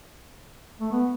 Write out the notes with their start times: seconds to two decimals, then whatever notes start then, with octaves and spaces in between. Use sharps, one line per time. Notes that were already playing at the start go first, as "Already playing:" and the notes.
0.81 A3
0.92 B3